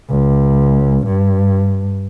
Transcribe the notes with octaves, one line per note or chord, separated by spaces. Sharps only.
C#2
G2